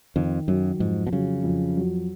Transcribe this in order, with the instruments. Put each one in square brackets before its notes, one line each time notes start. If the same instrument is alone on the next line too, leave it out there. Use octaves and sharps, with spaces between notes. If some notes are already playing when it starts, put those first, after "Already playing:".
[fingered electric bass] F2 [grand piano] D#3
[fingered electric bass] F#2 [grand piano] F#3
[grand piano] F2 [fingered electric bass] G#2
[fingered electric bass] B2
[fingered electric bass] C#3 [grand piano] F#3
[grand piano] F2
F#3